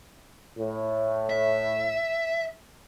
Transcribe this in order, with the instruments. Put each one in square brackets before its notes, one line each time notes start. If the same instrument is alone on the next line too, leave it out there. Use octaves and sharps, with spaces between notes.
[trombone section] A2
[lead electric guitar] E5